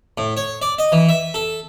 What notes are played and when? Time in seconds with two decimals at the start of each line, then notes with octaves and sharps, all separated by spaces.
0.18 A2
0.37 C#5
0.62 D5
0.79 D#5
0.92 E3
1.09 E5
1.34 A4